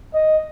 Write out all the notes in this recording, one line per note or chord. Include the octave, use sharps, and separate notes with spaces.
D#5